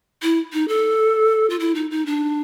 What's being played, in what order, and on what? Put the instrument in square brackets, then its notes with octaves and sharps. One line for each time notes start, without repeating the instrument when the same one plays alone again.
[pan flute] E4
D#4
A4
F4
E4
D#4
D#4
D4